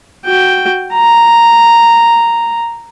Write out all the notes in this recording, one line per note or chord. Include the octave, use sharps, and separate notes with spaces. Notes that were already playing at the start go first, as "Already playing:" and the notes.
F#4 G5
A#5